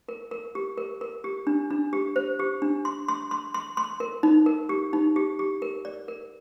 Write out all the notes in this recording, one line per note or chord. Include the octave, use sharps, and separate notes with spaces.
A#4
A#4
G4
A#4
A#4
G4
D4
D4
G4
C5
G4
D4
C6
C6
C6
C6
C6
A#4
D#4
A#4
G4
D#4
G4
G4
A#4
D5
A#4